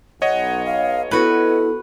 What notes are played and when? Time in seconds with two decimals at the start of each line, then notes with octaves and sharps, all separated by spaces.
0.22 B1 C#5 D#5 F#5
0.65 F5
1.11 B3 E4 F#4 A4 B4